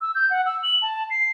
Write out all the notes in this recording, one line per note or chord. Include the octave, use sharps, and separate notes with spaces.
E6
G6
F#5
E6
F#7
A5
C7